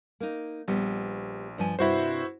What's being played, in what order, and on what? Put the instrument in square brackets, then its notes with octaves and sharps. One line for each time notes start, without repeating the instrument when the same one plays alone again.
[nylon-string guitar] A#3 D#4
[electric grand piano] A#1 [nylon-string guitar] G3 B3
[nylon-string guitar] G2 F3 G#5
[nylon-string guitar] G2 C3 [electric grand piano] E4 F#4 C5